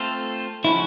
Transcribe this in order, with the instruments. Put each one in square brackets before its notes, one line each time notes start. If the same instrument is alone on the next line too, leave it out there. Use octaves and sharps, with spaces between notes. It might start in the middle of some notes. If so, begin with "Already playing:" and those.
Already playing: [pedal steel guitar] A3 C4 F4 A4 C5
[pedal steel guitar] C#3 F3 A3 C#4 F#4 [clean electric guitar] E4